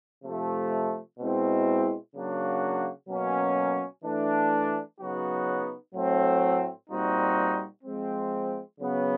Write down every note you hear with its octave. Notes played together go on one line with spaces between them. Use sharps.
C3 F3 A3
B2 G#3 C4 E4
C#3 F#3 A#3 D4 F#4
B2 F#3 A#3 C#4
E3 A3 D4
C#3 F#3 B3 D#4 F#4
A2 F#3 A3 C4
A#2 G3 C4 D#4 F#4
F3 G#3 C4
C#3 F#3 B3